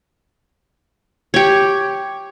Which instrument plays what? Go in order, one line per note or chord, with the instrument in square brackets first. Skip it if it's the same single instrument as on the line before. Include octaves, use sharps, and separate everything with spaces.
[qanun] G4 C#5